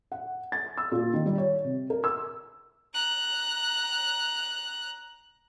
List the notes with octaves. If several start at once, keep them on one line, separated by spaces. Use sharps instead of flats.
F#5
A6
E6
A#2
D#3
G3
C#5
C3
A#4
E6
A#5 F#6